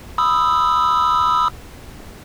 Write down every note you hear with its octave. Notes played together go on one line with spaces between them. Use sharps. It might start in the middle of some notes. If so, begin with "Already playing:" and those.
B5 D#6 E6